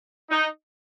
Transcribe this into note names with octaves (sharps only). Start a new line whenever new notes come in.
D#4